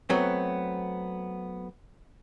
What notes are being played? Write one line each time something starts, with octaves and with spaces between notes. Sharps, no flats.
F#3 A3 B3 C4